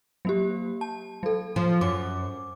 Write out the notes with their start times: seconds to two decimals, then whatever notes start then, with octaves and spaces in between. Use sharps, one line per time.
0.25 F#3 A#3 G4
0.81 A5
1.23 F#3 A4
1.56 F3
1.81 F#2 D6